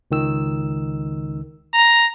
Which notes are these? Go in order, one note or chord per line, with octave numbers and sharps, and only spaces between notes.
C#2 D#3 E6
A#5